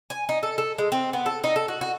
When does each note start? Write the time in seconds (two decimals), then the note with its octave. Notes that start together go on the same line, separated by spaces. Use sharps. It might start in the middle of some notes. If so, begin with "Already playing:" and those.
0.10 G#5
0.29 D#4
0.43 A4
0.58 A4
0.78 G#3
0.92 C4
1.13 B3
1.26 A4
1.44 D#4
1.56 A4
1.68 F#4
1.81 F#4